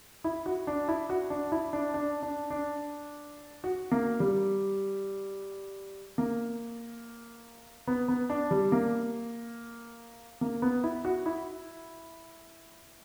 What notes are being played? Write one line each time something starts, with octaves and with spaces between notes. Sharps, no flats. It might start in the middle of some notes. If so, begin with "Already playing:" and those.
E4
F#4
D4
E4
F#4
D4
E4
D4
D4
D4
D4
F#4
A#3
G3
A#3
B3
B3
D4
G3
A#3
A#3
B3
E4
F#4
E4